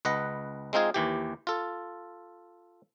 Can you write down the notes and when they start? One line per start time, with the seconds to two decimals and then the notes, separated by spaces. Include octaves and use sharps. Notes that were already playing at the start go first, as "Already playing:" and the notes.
0.05 C#2 B4 D#5 F#5
0.73 G#3 C4 D#4 F4 G#4
0.94 D#2 E3 G4
1.47 F4 A4